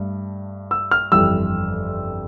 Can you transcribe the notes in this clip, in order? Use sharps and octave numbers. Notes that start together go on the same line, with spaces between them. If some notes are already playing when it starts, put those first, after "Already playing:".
Already playing: G2 A3
E6
F6
G1 F2 E3 G3 E6